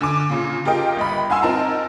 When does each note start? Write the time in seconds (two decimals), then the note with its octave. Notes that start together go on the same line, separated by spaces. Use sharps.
0.01 D3 G#5 D6
0.30 A#2 C#3
0.65 F4 G4 G#4 A#4 D#5 G5
0.97 G1 D#5 B5
1.30 F5 F#5 G#5 C6 E6
1.42 C4 D#4 A#4 A5 A#5